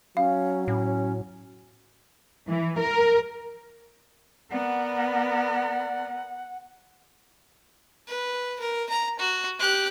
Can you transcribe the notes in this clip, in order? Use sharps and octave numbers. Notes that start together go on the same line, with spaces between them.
F#3 C#4 F5
A2 C#4
E3
A#4
B3 A#4 D5 F#5
B4
A#4
A#5
F#4
G4 F#6